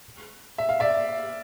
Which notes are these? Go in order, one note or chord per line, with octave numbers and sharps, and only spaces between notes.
E5
F5
D5 E5